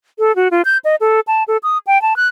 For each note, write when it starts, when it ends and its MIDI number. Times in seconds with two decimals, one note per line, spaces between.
0.19 0.35 69
0.36 0.48 66
0.51 0.62 65
0.65 0.78 91
0.85 0.96 75
1.01 1.20 69
1.27 1.43 81
1.48 1.57 69
1.63 1.78 87
1.87 2.01 79
2.02 2.16 81
2.16 2.27 90